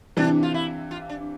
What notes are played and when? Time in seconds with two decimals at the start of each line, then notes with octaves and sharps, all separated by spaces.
0.17 C3 E3 D4
0.43 F4
0.54 E4
0.91 F4
1.10 D4